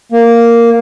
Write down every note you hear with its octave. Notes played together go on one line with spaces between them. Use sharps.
A#3